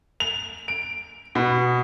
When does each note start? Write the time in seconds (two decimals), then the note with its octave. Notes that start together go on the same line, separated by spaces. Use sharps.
0.20 F7
0.68 D7
1.35 B2